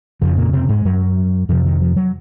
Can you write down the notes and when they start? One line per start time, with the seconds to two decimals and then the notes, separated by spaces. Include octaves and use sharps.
0.22 F2 C#3 F3
0.37 A#2 A#3
0.53 C3 C4
0.69 G#2 G#3
0.85 F#2 F#3
1.49 F2 C3 F3
1.65 D#3
1.81 F3
1.96 F#3